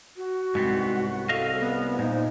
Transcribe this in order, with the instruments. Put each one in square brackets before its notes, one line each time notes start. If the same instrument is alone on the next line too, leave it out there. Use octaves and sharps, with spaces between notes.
[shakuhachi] F#4
[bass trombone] C2 [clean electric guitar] G#2 B3 C4
[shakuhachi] A4 [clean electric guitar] D#5 F5
[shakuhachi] B3
[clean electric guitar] A#2 [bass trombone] D#4 [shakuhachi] C5